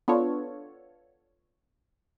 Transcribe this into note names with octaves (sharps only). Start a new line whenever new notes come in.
B3 D4 F4 A4 C#5